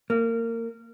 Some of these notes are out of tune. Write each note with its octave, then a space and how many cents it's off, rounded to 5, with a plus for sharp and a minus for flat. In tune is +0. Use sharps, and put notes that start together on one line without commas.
A#3 -25